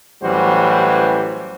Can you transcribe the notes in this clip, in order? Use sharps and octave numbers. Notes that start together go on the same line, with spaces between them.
A1 E3 F#3 G3 F#4 C5